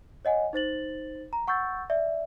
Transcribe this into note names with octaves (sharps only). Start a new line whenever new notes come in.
C#5 D#5 F#5 G#5
D#4 C5 A6 F#7
A#5
F#5 C#6 E6 G6 A6
D5 E5